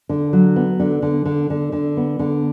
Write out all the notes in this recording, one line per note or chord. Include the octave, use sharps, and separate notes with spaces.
D3
F#3
B3
D3
D3
D3
D3
D3
B3
D3